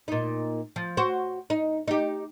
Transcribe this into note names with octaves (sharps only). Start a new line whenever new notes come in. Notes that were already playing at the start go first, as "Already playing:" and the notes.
A#2 D#4
F3
F#4 C5
D#4
D#4 G4